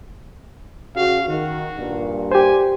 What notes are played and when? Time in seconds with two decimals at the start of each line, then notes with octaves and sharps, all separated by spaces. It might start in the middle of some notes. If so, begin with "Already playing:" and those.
0.96 C#3 F#4 F5
1.28 D#3 F#4
1.78 G2 A#2
2.32 G4 C5 G#5